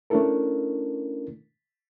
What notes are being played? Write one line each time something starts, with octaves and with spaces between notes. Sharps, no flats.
A3 C#4 D4 E4 A4 A#4